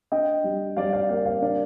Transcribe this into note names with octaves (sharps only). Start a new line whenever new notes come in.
D4 D#5 G5
G3
G3 D5 F5
D5 F5
A#3 D5 F5
D5 F5
D4 D5 F5